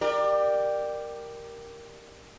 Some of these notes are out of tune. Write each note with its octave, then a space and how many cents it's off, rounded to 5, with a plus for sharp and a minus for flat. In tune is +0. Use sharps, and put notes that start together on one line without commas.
G4 +0 A#4 +0 D5 +25